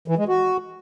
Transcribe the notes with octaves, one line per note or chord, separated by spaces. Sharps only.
E3
G#3
F#4